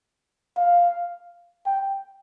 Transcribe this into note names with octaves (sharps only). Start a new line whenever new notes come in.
F5
G5